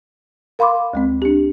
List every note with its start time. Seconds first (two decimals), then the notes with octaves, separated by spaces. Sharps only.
0.59 A#4 F5 B5 C6 D6
0.93 D2 G#3 C4
1.22 D4 G4